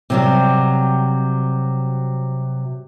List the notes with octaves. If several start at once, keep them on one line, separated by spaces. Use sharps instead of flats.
C3 F#3 G3